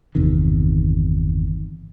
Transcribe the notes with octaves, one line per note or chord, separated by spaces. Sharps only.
G1 E2 C3 D#3